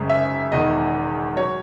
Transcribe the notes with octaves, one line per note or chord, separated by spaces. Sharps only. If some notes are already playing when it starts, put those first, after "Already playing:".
Already playing: G#1 F#2 C#3 G#3
E5
E1 E2 D#3 D#5
F#3 C#5